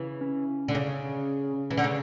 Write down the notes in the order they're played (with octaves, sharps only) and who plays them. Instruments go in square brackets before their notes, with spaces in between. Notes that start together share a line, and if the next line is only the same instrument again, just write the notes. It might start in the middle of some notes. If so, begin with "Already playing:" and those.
Already playing: [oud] C#3 E3
[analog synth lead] C#4
[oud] D3
C#3
E3
D3
C#3